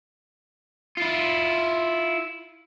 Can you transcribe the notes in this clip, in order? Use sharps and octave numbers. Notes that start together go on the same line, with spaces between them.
E4 F4